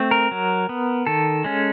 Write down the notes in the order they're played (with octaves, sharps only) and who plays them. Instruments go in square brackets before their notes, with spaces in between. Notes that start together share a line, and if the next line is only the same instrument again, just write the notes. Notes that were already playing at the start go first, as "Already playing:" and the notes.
Already playing: [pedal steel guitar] A3 C4
A#4
F#3
B3
D#3 A4
G#3 C#4